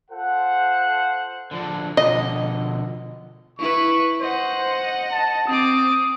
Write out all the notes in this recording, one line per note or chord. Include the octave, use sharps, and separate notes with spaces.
F4 A4 C5 F#5
D3 F3 D4
B2 D3 F3 D#5
E4 B4 C#6
C5 D#5 F#5
A5
C4 D6 D#6